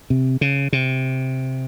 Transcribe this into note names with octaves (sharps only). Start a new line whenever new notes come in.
C3
C#3
C3